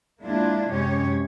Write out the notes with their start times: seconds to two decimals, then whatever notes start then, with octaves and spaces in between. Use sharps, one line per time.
0.23 G#3 A#3 D4 E4 F4
0.70 F#2 C3 G#3 C#4 G4 C#5